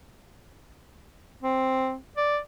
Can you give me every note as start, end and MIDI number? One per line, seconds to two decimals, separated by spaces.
1.42 1.95 60
2.17 2.39 74